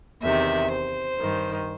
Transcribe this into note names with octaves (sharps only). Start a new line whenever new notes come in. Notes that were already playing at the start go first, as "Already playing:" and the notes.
E2 C3 D#3 E5
C5
G2 D#3